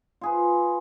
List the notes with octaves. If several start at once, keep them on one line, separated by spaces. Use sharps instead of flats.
F4 G#4 B4